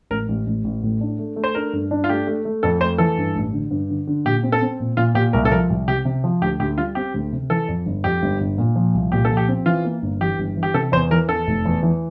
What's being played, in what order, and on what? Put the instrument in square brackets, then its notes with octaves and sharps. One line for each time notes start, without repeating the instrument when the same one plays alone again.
[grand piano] A1 [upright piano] A#4
[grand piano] A1
A1
A1
A2
D4
A3
A3
[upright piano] C5
[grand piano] D4 [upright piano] A#4
[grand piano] G2
D4
[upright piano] F4
[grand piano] A3 [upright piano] G4
[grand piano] A3
A3
[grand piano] F2 [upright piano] A4
[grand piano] A3 [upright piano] C5
[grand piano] E3 [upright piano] A4
[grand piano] G2
A1
D3
G2
D3
D3
[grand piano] A#2 [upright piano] G4
[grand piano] C4
[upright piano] A4
[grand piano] C4
A#2
[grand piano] A#2 [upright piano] F4
[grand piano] A#2 [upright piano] G4
[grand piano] C2 [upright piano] A#4
[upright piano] A4
[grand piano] F3 [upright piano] A#4
[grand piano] C2
[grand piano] C3 [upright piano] G4
[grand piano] C3
F3
[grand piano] D2 [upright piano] G4
[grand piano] D2 [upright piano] G4
[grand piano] G3 [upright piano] F4
[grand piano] C4 [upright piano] G4
[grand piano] D2
C3
[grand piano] E3 [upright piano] A4
[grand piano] F2
G1
[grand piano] F2 [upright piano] G4
[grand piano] G1
G1
A#2
F3
C2
[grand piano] A#2 [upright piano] G4
[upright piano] A4
[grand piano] F3
[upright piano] G4
[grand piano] C4
[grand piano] E3 [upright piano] F4
[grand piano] A#3
G1
[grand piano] E3 [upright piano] G4
[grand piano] G1
E3
[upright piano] G4
[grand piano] C3 [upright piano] A4
[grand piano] E2 [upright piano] C5
[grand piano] E3 [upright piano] A#4
[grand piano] E2 [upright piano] A4
[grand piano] F1
E2
E3